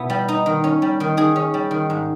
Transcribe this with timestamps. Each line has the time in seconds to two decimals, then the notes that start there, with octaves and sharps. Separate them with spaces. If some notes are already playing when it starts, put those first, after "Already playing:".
Already playing: B2 B3 E4
0.10 G3
0.28 D#4
0.46 D#3
0.64 C#4
0.82 G3
1.00 D#3
1.17 D#3 G#4
1.36 C#4
1.54 G3
1.71 D#3
1.90 G#2